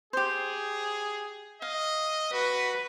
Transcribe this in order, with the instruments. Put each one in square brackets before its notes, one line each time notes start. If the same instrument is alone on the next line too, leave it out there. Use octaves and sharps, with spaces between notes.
[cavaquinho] G4 C5 [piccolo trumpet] G#4
[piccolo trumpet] D#5 [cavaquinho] F5
[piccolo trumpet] F#4 [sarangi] B4